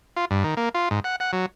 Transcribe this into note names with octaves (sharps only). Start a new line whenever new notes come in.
F4
G2
D#3
A#3
F4
G#2
F#5
F#5
F#3